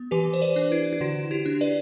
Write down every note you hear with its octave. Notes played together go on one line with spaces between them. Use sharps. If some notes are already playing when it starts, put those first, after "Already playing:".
Already playing: B3
E3 G4 B4
C5
B4 D5
D4
E4
E4
D3 F#4
E4 G4
D4
B4 D5